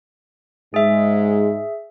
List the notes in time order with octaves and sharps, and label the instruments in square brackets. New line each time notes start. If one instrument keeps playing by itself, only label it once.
[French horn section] G#2 G#3 [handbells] G#4 E5